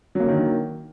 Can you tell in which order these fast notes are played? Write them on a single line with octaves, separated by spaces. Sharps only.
F#3 A#3 D3 D#3